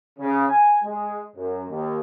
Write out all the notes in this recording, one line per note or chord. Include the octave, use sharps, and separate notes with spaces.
C#3
G#5
G#3
F#2
D#2